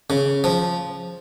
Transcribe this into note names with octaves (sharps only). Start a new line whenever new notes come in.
C#3
F3